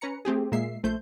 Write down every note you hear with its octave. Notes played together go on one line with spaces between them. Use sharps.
C#4 B4 A#5 C#7
A3 C4 G4 G#4
A#2 G#3 A#3 E5 C7
A#1 A3 C5 G6